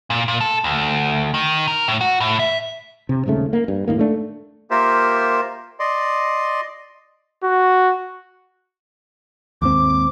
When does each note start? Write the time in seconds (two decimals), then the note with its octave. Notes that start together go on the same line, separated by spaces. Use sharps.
0.10 A#2
0.28 A#2
0.41 A4
0.64 D2
1.34 D#3
1.67 A#4
1.88 A2
2.01 F#4
2.20 A2
2.39 E5
3.09 C3
3.26 D#1 G#2 C#3 A3
3.53 A#3
3.68 G2
3.88 A2 C3 D#3 A#3
3.99 A3 D4
4.71 A#3 F4 G4 A#4 C5 E5
5.80 D5 D#5 C6
7.44 F#4
9.62 D#2 G#2 C4 D6